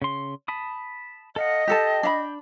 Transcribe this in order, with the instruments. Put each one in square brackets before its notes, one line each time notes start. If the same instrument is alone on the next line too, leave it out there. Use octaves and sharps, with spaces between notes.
[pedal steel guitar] C#3 C6
A5 B5 D#6
[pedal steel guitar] A4 F5 F#5 [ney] D#5
[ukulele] G4 A4 A5 [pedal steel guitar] G5
[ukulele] D4 E5 B5